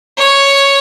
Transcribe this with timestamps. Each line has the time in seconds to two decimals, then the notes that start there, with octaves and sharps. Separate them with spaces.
0.18 C#5